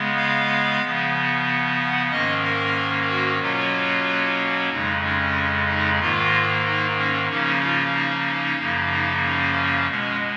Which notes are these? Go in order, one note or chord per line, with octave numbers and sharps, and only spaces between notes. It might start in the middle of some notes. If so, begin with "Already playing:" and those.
Already playing: C#3 G#3 B3
F5
C#3 F3 B3
F#5
G#2 D#3 A#3 C#4 D#5
A#4
F#4
B2 F#3 A#3 C#4 F4
F2 C#3 G#3 D#4
C#4
D#4
G#2 D#3 A#3 F4
D#4
C#4
C#3 F3 A#3 C#4 D#4
F4
D#4
D#4
F#2 C#3 F3 A#3
D#4
C#4
B2 G#3 C#4